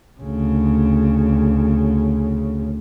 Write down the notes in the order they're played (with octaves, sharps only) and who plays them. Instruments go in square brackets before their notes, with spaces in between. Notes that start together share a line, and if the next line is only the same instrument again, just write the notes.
[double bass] D2 C#3